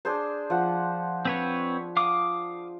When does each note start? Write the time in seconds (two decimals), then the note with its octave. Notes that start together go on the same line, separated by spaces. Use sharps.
0.05 D4 G#4 C5
0.50 F3 F#5
1.25 C4 B4 C#5
1.97 F5 D6 D#6